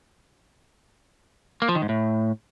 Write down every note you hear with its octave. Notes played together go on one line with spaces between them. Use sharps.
A#3
F3
D#3
G#2
A2